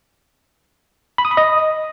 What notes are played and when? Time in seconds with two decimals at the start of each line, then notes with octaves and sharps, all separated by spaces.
1.18 B5
1.25 D#6
1.31 B5
1.37 D#5